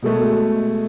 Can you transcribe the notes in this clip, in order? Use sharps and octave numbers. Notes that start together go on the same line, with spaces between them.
B2 G#3 A3